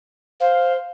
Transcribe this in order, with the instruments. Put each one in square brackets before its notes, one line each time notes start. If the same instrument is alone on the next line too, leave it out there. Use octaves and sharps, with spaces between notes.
[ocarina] C5 [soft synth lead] F5